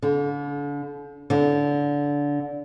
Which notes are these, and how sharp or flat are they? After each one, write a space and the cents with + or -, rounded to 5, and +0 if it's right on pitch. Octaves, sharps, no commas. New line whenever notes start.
D3 -35
D3 -20